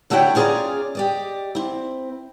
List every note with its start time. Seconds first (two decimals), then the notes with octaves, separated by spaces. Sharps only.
0.10 D3 A3 E4 F#4 C#5 G5
0.35 C#4 F4 G#4 C#5 D5 A#5
0.95 G4 D5 D#5
1.55 C4 E4